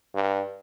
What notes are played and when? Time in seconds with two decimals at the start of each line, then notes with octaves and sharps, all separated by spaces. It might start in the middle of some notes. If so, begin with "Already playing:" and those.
0.15 G2